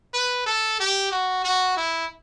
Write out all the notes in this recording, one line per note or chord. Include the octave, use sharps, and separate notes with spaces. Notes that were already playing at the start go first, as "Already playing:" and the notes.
B4
A4
G4
F#4
F#4
E4